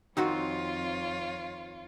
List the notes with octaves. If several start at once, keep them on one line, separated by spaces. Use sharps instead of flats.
F2 D#3 C4 F4 F#4 C#5